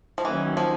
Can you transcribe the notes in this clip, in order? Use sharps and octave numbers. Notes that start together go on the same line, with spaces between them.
F3
D#3 E3 F#3 A#3 C#4
F3